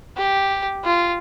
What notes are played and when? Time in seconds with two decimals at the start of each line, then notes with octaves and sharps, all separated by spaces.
0.17 G4
0.85 F4